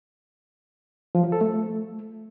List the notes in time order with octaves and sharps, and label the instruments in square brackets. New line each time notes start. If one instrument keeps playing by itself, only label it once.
[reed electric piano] F3
F#3
A4
A3